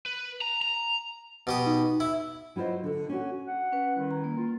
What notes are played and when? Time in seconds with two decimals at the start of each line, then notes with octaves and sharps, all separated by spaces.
0.06 B4
0.41 A#5
0.62 A#5
1.47 B2 G4 D#6
1.66 D#4
2.00 E4
2.56 F#3 E4 F4 C5 D#5
2.84 D3 A4
3.09 C#4 D4 F#4
3.47 F#5
3.72 C#4 B4
3.96 D#3 G3 E4
4.11 A#5
4.24 A#3
4.38 F4